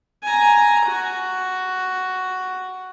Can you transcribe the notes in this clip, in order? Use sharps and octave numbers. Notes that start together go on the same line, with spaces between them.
G#5 A#5
F#4